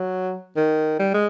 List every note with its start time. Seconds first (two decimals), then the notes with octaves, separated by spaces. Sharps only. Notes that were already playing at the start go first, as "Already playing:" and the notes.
Already playing: F#3
0.56 D#3
0.99 G3
1.14 G#3